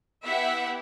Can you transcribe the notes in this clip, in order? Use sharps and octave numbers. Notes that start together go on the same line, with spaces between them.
B3 E4 G4 E5 F#5